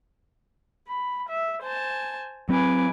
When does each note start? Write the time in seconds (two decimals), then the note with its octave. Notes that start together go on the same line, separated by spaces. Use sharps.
0.88 B5
1.29 E5
1.62 C5 G#5 A5
2.49 F#3 C4 B4 G#5 D6